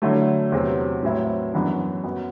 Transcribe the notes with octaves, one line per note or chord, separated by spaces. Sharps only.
D3 F#3 A3 E4
E2 C3 F#3 C4
A2 F#3 C4 E4
F#2 E3 B3 D4
F#2 F#3 B3